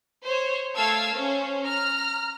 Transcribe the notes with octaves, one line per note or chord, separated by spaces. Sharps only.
C5 C#5
A3 A4 F5 E6 G#6
C#4 C5
A#5 F6